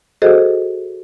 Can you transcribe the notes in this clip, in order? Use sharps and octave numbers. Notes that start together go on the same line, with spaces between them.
F#4 G#4 A4 C5 D#5